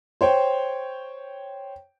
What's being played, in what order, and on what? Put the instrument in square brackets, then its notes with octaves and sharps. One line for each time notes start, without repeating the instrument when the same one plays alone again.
[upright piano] C5 C#5 G5